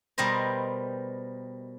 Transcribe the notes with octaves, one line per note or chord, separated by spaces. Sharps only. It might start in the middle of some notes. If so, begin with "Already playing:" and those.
B2 G3 A#4 C5 D#5